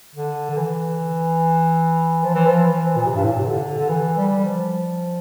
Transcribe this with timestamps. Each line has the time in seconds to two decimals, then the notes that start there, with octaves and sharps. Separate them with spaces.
0.15 D3
0.50 D3
0.57 E3
2.24 F3
2.34 E3
2.46 F3
2.65 E3
2.96 A#2
3.06 C3
3.15 G2
3.24 A2
3.31 A#2
3.39 C3
3.48 D3
3.79 D3
3.89 E3
4.17 G3
4.44 F3